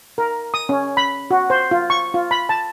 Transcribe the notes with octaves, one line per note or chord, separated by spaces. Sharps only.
A#4
D#6
C#4
B5
F#4
C5
F4
C#6
F4
B5
A5